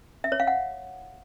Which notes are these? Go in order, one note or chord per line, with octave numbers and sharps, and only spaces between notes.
E5
C#5
F5
F#5